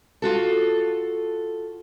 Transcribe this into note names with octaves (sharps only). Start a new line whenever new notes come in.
F4 F#4 A4